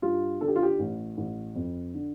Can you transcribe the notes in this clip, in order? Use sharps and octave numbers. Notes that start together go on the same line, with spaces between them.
G2 F4
D3 A4
G4
F4
G4
A1
A1
F2
D3